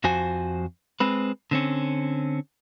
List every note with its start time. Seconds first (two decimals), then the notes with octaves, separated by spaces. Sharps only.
0.04 F2 F3 F#4 C5 G#5
1.00 G#3 C4 B4
1.51 D3 C4 C#4